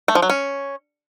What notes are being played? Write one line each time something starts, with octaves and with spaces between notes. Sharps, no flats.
A3
F3
F#3
C#4